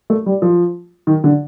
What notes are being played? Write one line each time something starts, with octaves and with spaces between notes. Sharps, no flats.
A3
G3
F3
D#3
D3